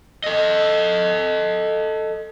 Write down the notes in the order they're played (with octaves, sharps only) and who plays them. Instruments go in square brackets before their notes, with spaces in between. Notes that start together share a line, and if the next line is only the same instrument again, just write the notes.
[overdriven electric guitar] A4 D#5